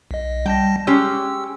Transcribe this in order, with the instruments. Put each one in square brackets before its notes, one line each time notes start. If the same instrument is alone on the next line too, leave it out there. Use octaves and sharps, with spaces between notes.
[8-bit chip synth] B1 D#5
[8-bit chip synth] G3 A5 A#6 [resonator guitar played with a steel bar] G5
[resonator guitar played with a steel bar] G#3 C#4 G4 [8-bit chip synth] E6